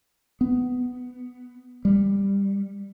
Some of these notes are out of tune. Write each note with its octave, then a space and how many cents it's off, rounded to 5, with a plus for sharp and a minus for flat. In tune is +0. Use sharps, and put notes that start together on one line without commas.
B3 +10
G3 +15